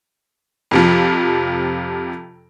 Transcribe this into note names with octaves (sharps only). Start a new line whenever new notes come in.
F2 C3 F3